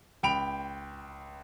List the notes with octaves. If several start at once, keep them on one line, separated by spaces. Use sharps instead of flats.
C#2 G5 B5 D7 F7